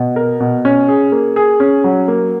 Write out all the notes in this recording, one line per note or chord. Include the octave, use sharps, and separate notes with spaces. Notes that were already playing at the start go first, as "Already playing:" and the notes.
Already playing: B2
A#4
B2
C#4
G#4
A#3
G#4
C#4
F#3
A#3